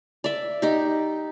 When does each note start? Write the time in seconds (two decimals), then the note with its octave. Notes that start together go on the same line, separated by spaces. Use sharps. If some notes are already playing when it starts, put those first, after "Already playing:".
0.24 D5 E5
0.62 D#4 G4